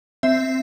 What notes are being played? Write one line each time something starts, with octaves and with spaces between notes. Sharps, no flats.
C4 E5